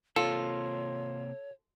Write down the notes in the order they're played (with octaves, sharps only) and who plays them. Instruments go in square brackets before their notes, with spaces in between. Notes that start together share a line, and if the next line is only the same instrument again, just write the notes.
[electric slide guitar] C3 A#3 C4 [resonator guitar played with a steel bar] F4 [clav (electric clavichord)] A4 [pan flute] C#5